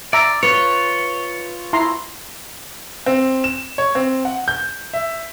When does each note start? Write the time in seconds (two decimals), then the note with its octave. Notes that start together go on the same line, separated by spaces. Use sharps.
0.13 D5 E5 A#5
0.43 F4 B4 C#5
1.73 E4 A#5 C6
3.06 C4
3.44 E7
3.78 C#5
3.95 C4
4.25 F#5
4.48 G6
4.93 E5